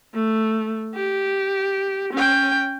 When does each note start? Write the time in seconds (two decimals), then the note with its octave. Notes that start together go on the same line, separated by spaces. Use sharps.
0.15 A3
0.95 G4
2.14 C#4 G5